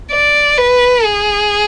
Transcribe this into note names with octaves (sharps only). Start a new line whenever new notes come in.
D5
B4
G#4